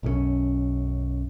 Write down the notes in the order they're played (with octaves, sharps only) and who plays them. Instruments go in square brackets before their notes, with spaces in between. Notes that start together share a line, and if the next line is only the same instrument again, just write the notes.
[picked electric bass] B1 F#2 G3 C#4